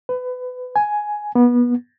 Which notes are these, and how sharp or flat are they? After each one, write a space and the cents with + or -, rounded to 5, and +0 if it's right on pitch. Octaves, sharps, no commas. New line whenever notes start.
B4 +25
G#5 +10
B3 -25